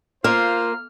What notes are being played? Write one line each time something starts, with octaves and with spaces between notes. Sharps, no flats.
A#3 F4 C5 F6